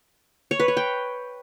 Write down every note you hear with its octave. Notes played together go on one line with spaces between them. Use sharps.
C#5
B4
C#5
G5